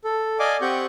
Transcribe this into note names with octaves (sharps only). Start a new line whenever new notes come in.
A4
D5 D#5 F5 G#5 D6
C4 G4 F#5 C#6 G6